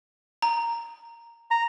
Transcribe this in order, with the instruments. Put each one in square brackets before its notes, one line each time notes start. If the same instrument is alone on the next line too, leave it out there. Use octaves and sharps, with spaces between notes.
[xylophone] A#5
[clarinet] A#5